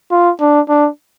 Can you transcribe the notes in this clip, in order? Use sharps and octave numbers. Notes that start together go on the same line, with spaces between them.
F4
D4
D4